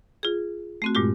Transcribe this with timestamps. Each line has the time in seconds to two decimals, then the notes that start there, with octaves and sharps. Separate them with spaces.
0.23 F4 G#4
0.82 A3 C4 F#4
0.95 G2 A#2 G#3 F4 G4